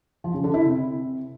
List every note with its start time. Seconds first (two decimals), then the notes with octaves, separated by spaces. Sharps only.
0.24 F3
0.34 C#3
0.44 D3
0.54 E4
0.64 C3